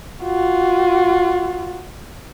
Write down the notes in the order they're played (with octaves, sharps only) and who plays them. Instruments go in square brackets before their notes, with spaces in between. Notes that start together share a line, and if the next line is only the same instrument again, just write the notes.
[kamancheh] F4 F#4